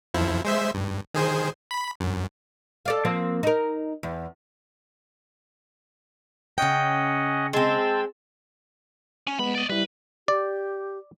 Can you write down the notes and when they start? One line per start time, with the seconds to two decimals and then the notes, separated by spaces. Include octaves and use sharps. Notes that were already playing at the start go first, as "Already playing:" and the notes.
0.14 F2 F3 E4
0.45 G#3 C5 E5
0.74 G2
1.14 D#3 G#4 C5
1.71 B5
2.00 F#2
2.86 A4 D5 F5
3.05 F3 A#3 C4
3.43 D#4 A#4
4.03 E2
6.58 C#3 C#4 D#5 F#5 G5
7.53 G#3 C4 A5 E6
9.27 C#4
9.39 F2 G#3 B3 B5
9.55 D5 D#5
9.70 G3 E4 B4
10.28 G4 D5